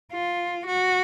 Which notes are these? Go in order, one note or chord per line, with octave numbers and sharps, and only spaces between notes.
F4
F#4